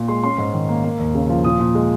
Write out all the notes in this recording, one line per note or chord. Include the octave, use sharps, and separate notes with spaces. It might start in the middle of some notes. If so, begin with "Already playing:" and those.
Already playing: A#2
G#3 C6
C#4 C6
G#2
D#3
A#3
A#3
D#2
C#3
F3
A#2 D#6
A#2
G#3